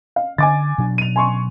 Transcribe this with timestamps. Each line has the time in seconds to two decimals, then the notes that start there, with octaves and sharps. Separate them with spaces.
0.16 F5
0.38 D3 G#5 D6 A6
0.78 B2 F#3 D4
0.98 D#7 F7
1.16 G#5 C6 C#6